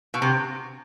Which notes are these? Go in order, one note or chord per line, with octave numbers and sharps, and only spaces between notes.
B2
C3